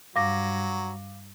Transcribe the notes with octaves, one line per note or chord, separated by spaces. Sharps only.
G2 F#3 F5 D6 A#6